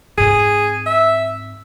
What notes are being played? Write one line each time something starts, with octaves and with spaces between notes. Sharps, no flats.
G#2 C4 G#4
E5